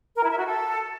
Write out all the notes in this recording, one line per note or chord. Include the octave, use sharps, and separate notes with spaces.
A#4
E4
E5
F#4
A4